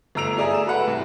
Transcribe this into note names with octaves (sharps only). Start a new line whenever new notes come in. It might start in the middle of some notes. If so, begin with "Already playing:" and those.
G1 A3 A#5 E6 D7 F7
G#4 D5 E5 G#5 A#5
A3 E7
F#4 A4 B4 F#5 B5
C2